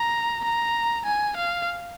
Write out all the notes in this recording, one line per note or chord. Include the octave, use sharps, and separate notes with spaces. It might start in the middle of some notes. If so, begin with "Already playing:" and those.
Already playing: A#5
A#5
G#5
F5